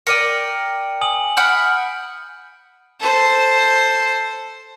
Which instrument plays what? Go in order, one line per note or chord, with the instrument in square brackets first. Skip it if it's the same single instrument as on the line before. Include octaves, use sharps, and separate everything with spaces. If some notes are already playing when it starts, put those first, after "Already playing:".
[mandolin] A#4 D5 G5 [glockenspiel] C#7 D#7
[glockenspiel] G#5 D#6 F#7
[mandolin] E5 F#5 B5 [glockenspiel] F6 G6 D7
[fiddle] A4 C5